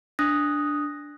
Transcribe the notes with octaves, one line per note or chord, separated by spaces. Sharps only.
D4 D#6 F#6 A#6